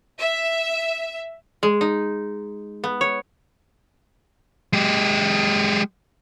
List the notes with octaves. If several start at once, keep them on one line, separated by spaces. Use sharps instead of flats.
E5
G#3
D#4
B3
C#5
G#3 G4